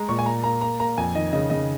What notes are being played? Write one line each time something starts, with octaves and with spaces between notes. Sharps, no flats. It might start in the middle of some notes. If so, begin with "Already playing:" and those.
Already playing: G#3 A#5
A#2 C#6
G#5
A#3 A#5
A#3 A#5
A#3 A#5
A#3 A#5
F2 G#5
D#3 D#5
C#3 D#5
C#3 D#5